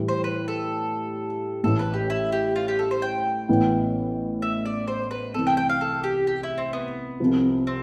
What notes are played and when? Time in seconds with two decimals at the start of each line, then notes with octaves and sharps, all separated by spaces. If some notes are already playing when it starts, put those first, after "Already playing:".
Already playing: A2 E3 G3
0.09 C5
0.24 B4
0.48 A4
1.63 A1 A2 E3 A4
1.79 B4
1.94 G4
2.10 E4
2.32 G4
2.56 F4
2.68 G4
2.79 A4
2.91 C5
3.02 G5
3.49 A1 A2 E3 B3
4.42 E5
4.66 D5
4.88 C5
5.11 B4
5.34 C2 C3 E3 A4
5.47 G5
5.57 G5
5.70 F5
5.81 A4
6.04 G4
6.27 G4
6.43 E4
6.58 C4
6.73 B3
7.20 C2 C3 F3
7.67 C4